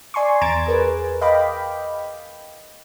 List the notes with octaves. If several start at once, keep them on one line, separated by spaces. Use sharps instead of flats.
D5 G#5 C6 C#6
E2 A#5 G#6 A6 D7 E7
G#4 A#4 B4
D#5 F5 G5 B5 D6